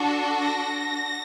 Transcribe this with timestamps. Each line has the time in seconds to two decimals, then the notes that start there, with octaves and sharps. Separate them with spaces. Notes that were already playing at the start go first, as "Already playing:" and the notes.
Already playing: D4 F#4 A4
0.41 A#6